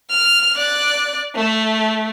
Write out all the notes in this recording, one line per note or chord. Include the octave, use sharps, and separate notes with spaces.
F6
D5 F#6
A3